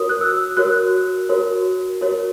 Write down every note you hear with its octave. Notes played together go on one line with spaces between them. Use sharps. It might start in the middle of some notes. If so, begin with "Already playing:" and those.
Already playing: F#4 A#4 C#5 D#6
F#6
E6
F#4 A#4 C#5 F#6
F#4 A#4 C#5
F#4 A#4 C#5